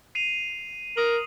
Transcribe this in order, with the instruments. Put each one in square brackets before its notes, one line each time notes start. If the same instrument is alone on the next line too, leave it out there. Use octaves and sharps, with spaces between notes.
[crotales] C7 D#7 F7
[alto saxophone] A#4 [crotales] D#6 F#7